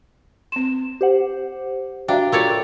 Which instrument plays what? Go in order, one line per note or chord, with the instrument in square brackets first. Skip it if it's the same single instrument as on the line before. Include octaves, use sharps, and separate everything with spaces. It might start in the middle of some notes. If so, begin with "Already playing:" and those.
[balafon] C4 C6 [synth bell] E7
[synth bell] G4 C5 F#5
[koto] D4 [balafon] F#4 E5 F5 [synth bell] G5 A#5
[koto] A3 C#5 D5 [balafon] F4 G4 A#4